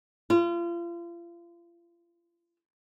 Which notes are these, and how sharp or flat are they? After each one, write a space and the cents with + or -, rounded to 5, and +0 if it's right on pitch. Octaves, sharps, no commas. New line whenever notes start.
F4 -35